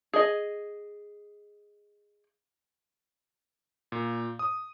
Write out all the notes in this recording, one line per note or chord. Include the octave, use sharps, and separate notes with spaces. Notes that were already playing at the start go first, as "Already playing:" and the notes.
G#4 D#5
A#2
D#6